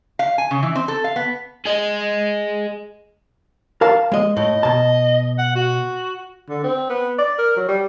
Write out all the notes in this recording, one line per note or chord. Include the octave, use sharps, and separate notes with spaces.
F5
G#5
C#3
E3
C4
A4
F5
B3
G#4 D#5
A#4 F5 A5
G#3 D#5
A2 D#5
B2 A5
F#5
F#4
D3
C4
B3
D5
A#4
F#3
G3